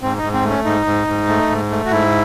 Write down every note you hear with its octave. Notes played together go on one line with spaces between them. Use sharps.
G#2 C4
D#4
G#2
C4
A3 C#4
G#2 D#4
G#2
G#2
A3
G#2
A3
F#4
G#2 E4